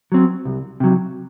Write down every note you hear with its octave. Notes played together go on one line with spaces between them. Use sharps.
F#3 C4
C2
C3 F#3